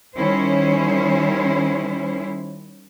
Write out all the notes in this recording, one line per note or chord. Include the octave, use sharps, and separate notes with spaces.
D#3 G3 C#4 E4 C5 C#5